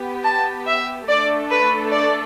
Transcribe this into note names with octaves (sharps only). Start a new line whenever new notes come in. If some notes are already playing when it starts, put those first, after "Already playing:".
Already playing: B3 G4
A5
E5
A3 D4 A4 D5
B4
D5